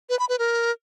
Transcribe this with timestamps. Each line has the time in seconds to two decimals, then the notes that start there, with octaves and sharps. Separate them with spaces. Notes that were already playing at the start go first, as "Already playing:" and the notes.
0.10 B4
0.19 B5
0.29 B4
0.39 A#4